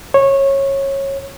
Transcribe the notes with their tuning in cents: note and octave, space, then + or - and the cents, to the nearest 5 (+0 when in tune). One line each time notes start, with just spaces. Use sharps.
C#5 -20